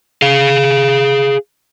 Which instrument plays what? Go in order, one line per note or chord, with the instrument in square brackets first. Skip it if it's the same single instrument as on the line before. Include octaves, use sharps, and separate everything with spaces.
[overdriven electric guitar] G#4 F5